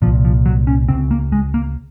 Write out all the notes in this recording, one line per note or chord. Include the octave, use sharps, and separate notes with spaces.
C2 A#2 F3
F3
F#3
C#4
C#2 C#3 C4
A#3
G#3
A#3